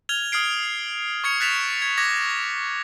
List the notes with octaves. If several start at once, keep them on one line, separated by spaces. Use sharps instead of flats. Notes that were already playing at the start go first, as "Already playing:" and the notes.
F6 G#6 F7 G7
D#6 F6 G#6 C7 D7
C#6 G#6 C#7 F7
F#6 A6 B6 E7 F7
G#6
D6 F#6 G#6 A#6